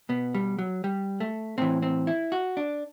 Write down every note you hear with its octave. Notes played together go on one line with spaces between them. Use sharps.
B2 B3
G3
F#3
G3
A3
A2 E3 C4
C4
E4
F#4
D4